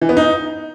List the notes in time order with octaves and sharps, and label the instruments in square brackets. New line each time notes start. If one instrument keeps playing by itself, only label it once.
[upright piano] E3
B3
D#4